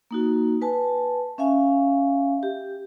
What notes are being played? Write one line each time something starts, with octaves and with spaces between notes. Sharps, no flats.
A#3 D#4 F#4
B4 G#5 A5
C#4 E5 F5 G#5
G4